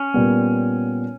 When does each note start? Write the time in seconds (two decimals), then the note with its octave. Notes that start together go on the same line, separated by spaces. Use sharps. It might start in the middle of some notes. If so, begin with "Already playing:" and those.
Already playing: C#4
0.14 A#2 G3 B3